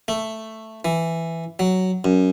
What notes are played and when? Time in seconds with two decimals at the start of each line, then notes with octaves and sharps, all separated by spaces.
0.08 A3
0.85 E3
1.59 F#3
2.04 F#2